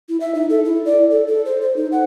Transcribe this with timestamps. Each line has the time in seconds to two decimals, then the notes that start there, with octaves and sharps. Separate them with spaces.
0.09 E4
0.20 E5
0.35 D#4
0.50 A4
0.65 E4
0.85 D5
1.11 A4
1.27 A4
1.46 C5
1.62 C5
1.76 D#4
1.92 F#5